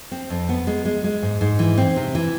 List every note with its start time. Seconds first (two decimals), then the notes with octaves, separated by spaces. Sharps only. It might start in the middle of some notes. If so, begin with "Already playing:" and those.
0.12 C4
0.30 F2
0.49 B3
0.67 G#3
0.85 G#3
1.04 G#3
1.22 G#2
1.41 G#2
1.59 E3
1.78 C4
1.96 C3
2.15 E3